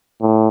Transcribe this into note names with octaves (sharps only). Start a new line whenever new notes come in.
A2